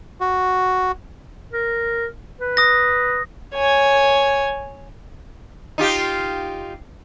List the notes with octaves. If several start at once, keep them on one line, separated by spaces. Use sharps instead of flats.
F#4
A#4
B4
D#6 A#6
C#5 G#5
D#4 F4 G4